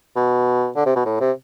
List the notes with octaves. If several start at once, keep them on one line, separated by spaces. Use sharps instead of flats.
B2
D3
C3
B2
A2
C3